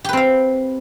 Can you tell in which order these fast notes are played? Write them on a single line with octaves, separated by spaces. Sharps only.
G4 B4 C4 F5